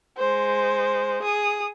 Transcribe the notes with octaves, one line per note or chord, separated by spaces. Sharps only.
G#3 C5
G#4 D#6